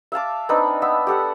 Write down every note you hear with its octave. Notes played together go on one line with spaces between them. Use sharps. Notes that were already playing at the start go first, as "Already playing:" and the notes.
E5 F5 A5 D6
C4 D4 D#4 B4
B3 B4 E5
G4 A4 F#5